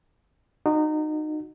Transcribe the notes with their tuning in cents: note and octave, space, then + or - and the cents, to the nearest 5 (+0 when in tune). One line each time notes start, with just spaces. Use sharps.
D#4 -25 F#4 -15